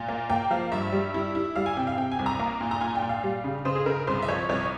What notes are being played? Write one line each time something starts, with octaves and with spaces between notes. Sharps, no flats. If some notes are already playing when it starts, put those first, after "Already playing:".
Already playing: A#2
A#3
A#3 G5
F3 F5
G2 E5
G3
E4
E4
G3 F5
G#5
C3 G5
F5
C3 G5
G#5
C2
A#5
A#3
A#2
A#5
A#2 G#5
G5
A#2
F5
G3
C#3
C#3 C5
G#4
C#3 A#4
C2 C5
E5
F3 C#5
C2 C#5